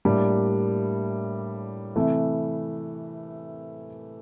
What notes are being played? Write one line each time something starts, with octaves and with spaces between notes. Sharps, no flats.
A2 G3 A#3 D4 G4
C3 E3 A3